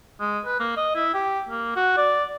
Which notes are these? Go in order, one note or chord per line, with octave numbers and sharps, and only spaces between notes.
G#3
B4
A#3
D#5
E4
G4
A#3
F#4
D5